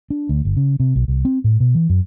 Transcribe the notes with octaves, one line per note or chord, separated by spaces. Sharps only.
D4
D2
G1
C#3
C3
B1
C2
C4
A2
B2
E3
F#2